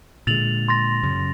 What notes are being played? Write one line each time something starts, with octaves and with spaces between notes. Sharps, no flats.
A#2 D3 G#3 A6 F7 F#7
C6 A6 A#6
F#2 C#3